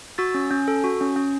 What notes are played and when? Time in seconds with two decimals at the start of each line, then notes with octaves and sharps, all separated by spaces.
0.18 F#4 E6 A6
0.34 C#4
0.51 C#4
0.68 A4
0.84 F#4
1.01 C#4
1.16 C#4